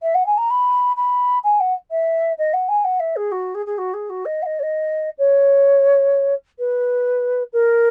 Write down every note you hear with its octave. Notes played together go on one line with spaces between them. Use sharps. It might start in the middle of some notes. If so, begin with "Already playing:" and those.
E5
F#5
G#5
A#5
B5
B5
G#5
F#5
E5
D#5
F#5
G#5
F#5
E5
G#4
F#4
G#4
G#4
F#4
G#4
F#4
D#5
F#5
D#5
C#5
D#5
C#5
B4
A#4